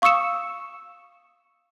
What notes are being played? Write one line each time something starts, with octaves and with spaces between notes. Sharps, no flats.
F5 C#6 D#6 E6 C#7 E7